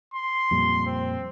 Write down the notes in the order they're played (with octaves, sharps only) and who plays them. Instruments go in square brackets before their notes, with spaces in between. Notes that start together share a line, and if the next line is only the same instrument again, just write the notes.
[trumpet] C6
[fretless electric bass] F2 A#2 G3
[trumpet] C4